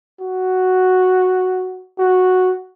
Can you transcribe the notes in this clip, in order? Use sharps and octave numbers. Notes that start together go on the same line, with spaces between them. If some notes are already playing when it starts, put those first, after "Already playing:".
F#4
F#4